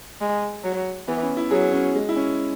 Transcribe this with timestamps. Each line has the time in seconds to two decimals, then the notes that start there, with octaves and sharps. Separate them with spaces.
0.21 G#3
0.64 F#3
1.08 E3 B3
1.23 C#4
1.37 E4
1.51 F#3 G#4
1.73 C#4
1.95 G#3
2.09 E4
2.16 C#4